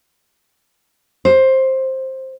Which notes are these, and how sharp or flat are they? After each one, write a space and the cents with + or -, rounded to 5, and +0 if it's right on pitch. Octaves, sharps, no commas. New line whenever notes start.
C5 +10